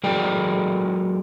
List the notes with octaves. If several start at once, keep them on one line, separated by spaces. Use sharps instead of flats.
F#3 G#3 G#4 A#4 D5 G5